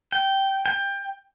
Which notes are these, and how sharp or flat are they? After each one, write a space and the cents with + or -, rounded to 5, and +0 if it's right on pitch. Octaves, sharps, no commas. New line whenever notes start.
G5 -15
G5 +20